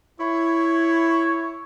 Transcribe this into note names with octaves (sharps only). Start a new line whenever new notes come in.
E4 C#5